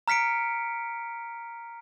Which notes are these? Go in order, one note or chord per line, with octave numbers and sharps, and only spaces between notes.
A#5 F6 B6 C#7 D7